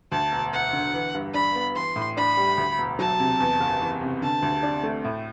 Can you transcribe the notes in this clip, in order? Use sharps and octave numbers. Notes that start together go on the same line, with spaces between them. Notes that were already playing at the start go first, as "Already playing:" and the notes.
D2 A5
E1
E1 F#5
D3
E3
G2
D4 B5
B3
E3 C6
A2
D4 B5
G3
D2
E1
F#3 A5
C3
E2
F#1
E3
C3
D3 A5
D2
D4
A3
A2